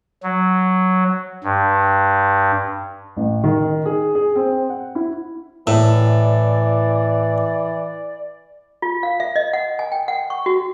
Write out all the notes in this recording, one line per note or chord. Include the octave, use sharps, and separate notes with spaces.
F#3
G2
A1
D#3
G#4
G#4
C4
F#5
E4
A2 E3 D5
F4
F5
E5
D#5
F#5
G#5
G5
F#5
C#6
F#4